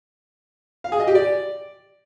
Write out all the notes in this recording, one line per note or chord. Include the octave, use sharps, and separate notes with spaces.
F5
G#4
D#5
G4
D5